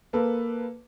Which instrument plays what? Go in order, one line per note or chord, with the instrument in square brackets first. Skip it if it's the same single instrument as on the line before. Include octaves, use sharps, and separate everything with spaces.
[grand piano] A#3 A4 B4